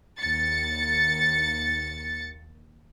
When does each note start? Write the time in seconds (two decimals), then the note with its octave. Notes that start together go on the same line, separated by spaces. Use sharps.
0.20 D#2 A6 C#7